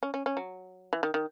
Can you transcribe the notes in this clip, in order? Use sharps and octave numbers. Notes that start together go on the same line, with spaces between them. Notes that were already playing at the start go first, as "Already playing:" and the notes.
C#4
C#4
C#4
F#3
E3
D#3
D#3